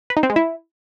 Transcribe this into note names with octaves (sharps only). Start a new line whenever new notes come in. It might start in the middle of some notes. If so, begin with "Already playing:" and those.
B4
D#4
C4
G#3
E4